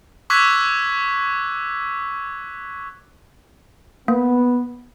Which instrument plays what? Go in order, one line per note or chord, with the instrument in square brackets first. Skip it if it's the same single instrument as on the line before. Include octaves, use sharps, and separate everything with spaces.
[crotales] C#6 D6 E6 F#6 G#6 B6
[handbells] A#3 [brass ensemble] B3